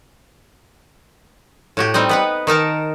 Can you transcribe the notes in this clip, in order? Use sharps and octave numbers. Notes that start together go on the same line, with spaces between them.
A2 F#4 G4
G3 C4 D#4 D#5
B3 B4 F#5
D#3 D#4 A#4 A5